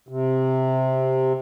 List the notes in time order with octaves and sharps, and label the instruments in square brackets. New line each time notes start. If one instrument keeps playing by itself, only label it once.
[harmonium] C3